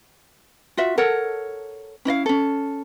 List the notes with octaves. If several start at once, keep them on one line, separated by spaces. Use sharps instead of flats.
F4 F#4 E5
A4 A#4 C#5 F#5
C#4 E4 D#5 F5
C#4 A4